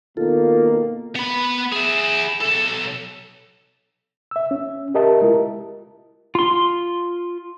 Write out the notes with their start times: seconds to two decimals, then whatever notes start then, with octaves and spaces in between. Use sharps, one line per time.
0.17 B2 D#3 A#3 F4 A4
1.16 B3 B5
1.72 E4 G#4
2.41 B1 A4
4.31 E5 E6
4.51 C#4
4.95 G4 A#4 D#5 E5 A5
5.22 G#3 E4 F4 A#4
6.35 F4 C6